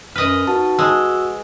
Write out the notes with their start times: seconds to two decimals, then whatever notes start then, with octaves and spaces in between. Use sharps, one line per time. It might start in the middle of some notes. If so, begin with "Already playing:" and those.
0.16 F#2 B4 D#5 F6
0.47 D#4 F#4 A5
0.79 G#3 E6